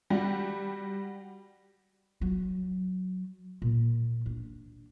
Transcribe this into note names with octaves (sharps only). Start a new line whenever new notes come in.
G3 F#4
F#3
A#2
D4